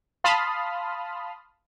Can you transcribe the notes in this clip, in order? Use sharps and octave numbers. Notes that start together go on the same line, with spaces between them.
F5 A5 B5 C6 D#6 F6